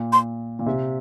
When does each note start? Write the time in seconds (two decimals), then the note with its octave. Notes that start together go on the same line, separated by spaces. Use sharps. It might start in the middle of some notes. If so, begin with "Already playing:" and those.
Already playing: A#2
0.13 C6
0.59 A#2
0.66 C3